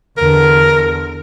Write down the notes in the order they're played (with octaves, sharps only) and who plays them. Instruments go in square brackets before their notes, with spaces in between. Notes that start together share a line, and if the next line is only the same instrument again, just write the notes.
[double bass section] E2 D3 [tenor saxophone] A#4